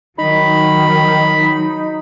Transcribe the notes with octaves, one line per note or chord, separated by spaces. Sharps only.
D#3 F#3 D#4 B5